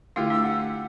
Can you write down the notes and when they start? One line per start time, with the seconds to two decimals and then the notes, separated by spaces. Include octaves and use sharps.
0.16 D3 A3 E4 F4 G4
0.30 D4 E6
0.43 F#5